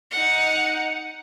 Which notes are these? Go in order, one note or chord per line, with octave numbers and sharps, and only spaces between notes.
D#4 F#5